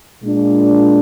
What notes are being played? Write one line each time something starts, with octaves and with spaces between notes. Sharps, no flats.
A#2 G#3 D4